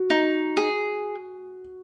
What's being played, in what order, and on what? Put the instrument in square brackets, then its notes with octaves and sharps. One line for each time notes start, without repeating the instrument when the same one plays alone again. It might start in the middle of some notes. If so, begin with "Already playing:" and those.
Already playing: [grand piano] F#4
[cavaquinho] D#4
G#4